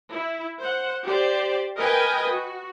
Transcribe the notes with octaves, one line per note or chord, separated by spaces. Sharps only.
E4
C5 F#5
G4 C5 D5
A#4 B4 D#5 G5 G#5
F#4